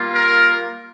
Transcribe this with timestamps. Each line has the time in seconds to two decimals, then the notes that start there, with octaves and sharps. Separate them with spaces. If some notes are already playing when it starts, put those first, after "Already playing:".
Already playing: G3 A#3 F4
0.14 A#4